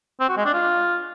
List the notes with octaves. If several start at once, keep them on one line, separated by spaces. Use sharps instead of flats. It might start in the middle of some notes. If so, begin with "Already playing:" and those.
C4
F#4
G#3
D4
F4